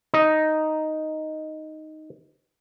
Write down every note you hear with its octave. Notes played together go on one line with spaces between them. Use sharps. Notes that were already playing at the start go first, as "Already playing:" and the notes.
D#4 D#5